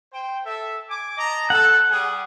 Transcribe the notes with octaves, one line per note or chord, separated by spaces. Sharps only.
C5 G5
A4 E5
G#5 D6
D#5 A5 A#5
A4 F#5
G3 G#4 D#6